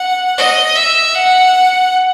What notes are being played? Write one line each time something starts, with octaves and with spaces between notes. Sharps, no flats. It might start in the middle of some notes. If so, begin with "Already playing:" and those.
Already playing: F#5
D#5
E5
F#5